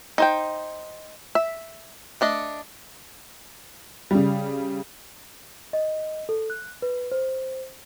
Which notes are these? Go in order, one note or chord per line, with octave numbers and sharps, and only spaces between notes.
D#4 C5 G5
E5
A3 D4 D#5
C#3 G3
D#5
A4
F#6
B4
C5